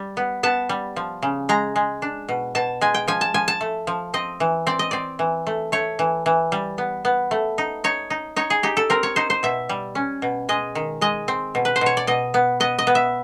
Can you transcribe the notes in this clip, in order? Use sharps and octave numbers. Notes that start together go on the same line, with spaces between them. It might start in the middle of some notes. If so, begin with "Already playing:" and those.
Already playing: G3
B3
B3 A5
G3
F3
C#3
G#3 A#5
G#3
D4
B2
B2 A5
G#3 G#5
G5
F3 G#5
A5
F3 G#5
A5
A3
F3
C4 D#5
E3
C4 D5
D#5
C4 D5
E3
A3
A3 C#5
E3
E3
G3
B3
B3
A3
D#4
D#4 C#5
D#4
D#4 C#5
G#4
D#4 G4
A4
C4 A#4
C#5
D#4 C5
C5
B2 E5
G3
C#4
B2
G#3 D#5
D#3
G#3 D#5
C4
B2
B4
C5
B2 C#5
D5
B2 D#5
B3
B3 D#5
D#5
B3
E5